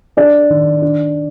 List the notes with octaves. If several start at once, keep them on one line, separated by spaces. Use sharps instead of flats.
D4 D5
D#3
D4